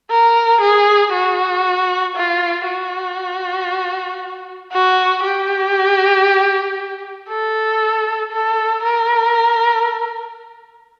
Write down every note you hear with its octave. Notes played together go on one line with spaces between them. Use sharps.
A#4
G#4
F#4
F4
F#4
F#4
G4
A4
A4
A#4